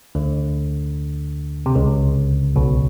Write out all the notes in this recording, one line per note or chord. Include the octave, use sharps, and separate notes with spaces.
D2 D3
C3
C#2 C#3
B1 B2